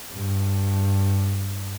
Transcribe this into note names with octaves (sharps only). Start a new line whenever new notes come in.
G2